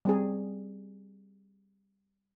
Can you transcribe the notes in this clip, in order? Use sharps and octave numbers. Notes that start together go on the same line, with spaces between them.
G3 C4 G#4